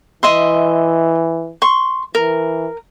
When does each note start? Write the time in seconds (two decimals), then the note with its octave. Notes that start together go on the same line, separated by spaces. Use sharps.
0.23 E3 D#5 E5 C6
1.62 C6 C#6
2.15 E3 A#4